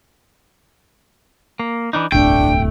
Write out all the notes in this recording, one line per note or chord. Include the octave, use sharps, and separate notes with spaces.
A#3
E3 D4 D#4
D1 G1 C2 A3 D4 G5